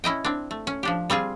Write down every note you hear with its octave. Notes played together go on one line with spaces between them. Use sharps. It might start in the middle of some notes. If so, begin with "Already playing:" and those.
C#4 E4 D#5 G5
C4 D4
A3
C#4
F3 D4 G4
G3 C4 F4 G#4